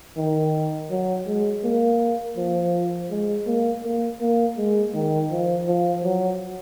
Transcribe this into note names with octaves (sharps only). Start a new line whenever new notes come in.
D#3
F#3
G#3
A#3
F3
G#3
A#3
A#3
A#3
G#3
D#3
F3
F3
F#3